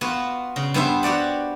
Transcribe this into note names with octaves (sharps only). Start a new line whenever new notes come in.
B3 F4 F#4
C#3
G2 B3 C5 E5
F#4 G4 D5 F#5